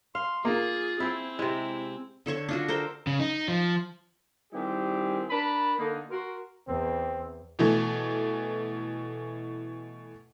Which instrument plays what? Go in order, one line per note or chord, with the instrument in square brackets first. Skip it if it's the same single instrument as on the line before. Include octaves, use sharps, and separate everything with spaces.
[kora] F5 [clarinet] C6
[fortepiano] A#3 [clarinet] F4 [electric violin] G#4
[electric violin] C4 [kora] E4 G#4
[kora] C3 G#3 [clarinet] E4
[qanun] D3 A4 C#5 C#6
D4 F4 F#4
A4 A#4 C5 G5
[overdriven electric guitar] C#3
D#4
F3
[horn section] D#3 G3 C4 E4 G4 G#4
D4 A#4 A5 B5
D3 A#3 D#4
F#4 A#4 C6
[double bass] E2 [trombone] C4
[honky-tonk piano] B2 E3 A3